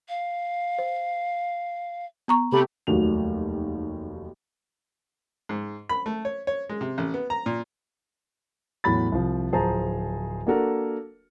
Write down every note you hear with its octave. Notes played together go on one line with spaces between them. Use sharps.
F5
C5
B3 A#5 C#6
C3 A3 G4 B5
F1 D#2 F#3 F7
G#2
B5
A3
C#5
C#5
G#3
C3
A1
B3
A#5
A#2
E2 A2 F#3 B5 A6
C2 F3
D1 F3 G#4 C5 A5 A#5
A#3 D4 F#4 A4 A#4